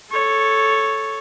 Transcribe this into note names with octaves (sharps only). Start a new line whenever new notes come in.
A4 C#5